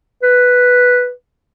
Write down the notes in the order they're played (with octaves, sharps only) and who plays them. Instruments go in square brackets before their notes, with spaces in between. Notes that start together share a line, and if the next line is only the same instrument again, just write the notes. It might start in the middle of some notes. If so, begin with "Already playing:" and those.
[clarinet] B4